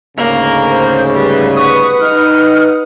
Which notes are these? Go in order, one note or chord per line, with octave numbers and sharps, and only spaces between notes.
D2 G#2 C#3 A#3
C5
G3 B4
B4 F#5 C#6 D#6
D#4 F6